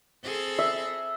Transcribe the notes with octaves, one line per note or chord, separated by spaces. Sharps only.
C4 G#4 A4
E5